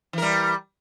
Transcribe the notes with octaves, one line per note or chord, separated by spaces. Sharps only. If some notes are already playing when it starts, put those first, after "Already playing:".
E3 G3 A#4